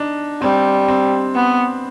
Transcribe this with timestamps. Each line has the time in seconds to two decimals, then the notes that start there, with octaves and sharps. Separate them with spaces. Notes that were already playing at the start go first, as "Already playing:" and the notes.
Already playing: D4 D#4
0.42 G3 C4
0.88 C4
1.35 B3